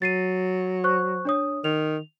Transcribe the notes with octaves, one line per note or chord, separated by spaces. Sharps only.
F#3 A6 C7 D#7
C5 C#6 F#6
D4 C#5 D#6
D#3 F7